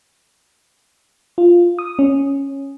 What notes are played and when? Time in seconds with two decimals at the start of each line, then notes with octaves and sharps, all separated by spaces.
1.38 F4
1.79 D#6
1.99 C#4